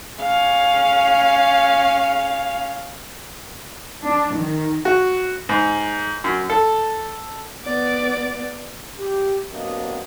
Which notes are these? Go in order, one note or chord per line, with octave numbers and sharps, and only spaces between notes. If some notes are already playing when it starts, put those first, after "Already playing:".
C#4 F5
D4
D#3
F#4
G#2
F#2
A4
B3 D5
G4
C2 F#3 A#3 B3 D4 D#5